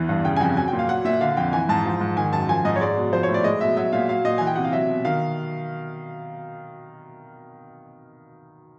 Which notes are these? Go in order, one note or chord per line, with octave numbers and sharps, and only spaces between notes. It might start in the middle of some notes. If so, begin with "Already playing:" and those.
Already playing: E2 E3
G2
C#3 G5
G#5
F2 G5
F#3 G#5
G5
A#2
F5
F#3 F#5
A#2 E5
D3 F5
F2 G5
E3 G#5
G#2 A5
F3
G#2
D#3 G#5
F#2 A5
F3 G#5
G#2 D#5
C#5
G#3 D5
B2
F3 C5
C#5
A2
D5
G#3 D#5
B2 E5
F#3 E5
A#2 F5
F#3 F5
A#2 D#5
E3 G#5
G5
C3 F#5
F5
F#3 E5
B2
D#3 F5